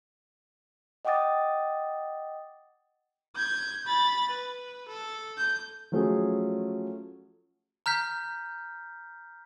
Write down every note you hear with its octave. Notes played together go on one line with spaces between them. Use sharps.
D#5 F#5 G5 D6 D#6 A6
G6 G#6
B5 A6
B4
A4
G6
F3 F#3 A3 C#4 G#4
A#5 F6 G6 B6